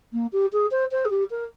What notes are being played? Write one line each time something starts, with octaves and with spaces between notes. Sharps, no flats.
A#3
G4
G#4
C5
C5
G#4
G4
A#4